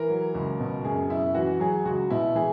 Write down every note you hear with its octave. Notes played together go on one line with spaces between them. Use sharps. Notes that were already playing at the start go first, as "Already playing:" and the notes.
Already playing: E3 A#4
F#3
C#2
B2
F#2 G#4
F#2 E4
E3 F#4
F#3 G#4
C#2 F#4
B2 E4
E3 G#4